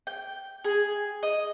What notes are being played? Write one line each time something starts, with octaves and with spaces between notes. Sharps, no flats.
G5
G#4
D#5